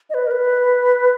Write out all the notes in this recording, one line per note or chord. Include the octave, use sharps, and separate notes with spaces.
D#5
B4
A#4
B4